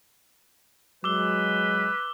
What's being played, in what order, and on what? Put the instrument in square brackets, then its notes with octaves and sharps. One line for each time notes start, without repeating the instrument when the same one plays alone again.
[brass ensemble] F#3 G#3 [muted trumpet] B4 [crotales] D6 E6 G7